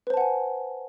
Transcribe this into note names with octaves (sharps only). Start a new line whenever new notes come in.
B4 C5 F#5 G#5 A5